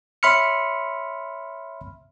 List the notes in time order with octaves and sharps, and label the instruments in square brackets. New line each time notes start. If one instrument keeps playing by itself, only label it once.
[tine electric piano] C#5 E5 B5 C6 F6 C#7